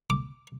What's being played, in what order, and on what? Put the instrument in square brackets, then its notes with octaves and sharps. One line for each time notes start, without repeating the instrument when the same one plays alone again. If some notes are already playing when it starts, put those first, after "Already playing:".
[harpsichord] D6